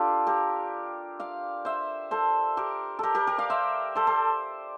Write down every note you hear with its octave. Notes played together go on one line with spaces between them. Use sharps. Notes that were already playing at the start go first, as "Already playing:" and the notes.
Already playing: D4 F4 G4 A4
G4 A#4
D5 F5
C5 E5
A4 C5
G4 A#4
G4 A4 A#4
G4 A#4
G4 A#4
D5 F5
C5 E5
A4 C5
A4 C5